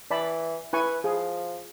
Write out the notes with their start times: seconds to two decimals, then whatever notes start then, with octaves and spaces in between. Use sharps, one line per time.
0.11 E3 D5 A5 B5
0.73 E4 B4 G#5 C#6
1.04 F3 G#4